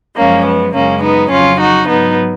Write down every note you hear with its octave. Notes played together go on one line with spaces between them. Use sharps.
F#2 F3 G#3 A#3 C#4
B3
F#2 C#3 G#3 A#3 C#4
B3 D#4
F2 C#3 F#3 C#4 F4
D#4 F#4
G#2 F#3 B3 D#4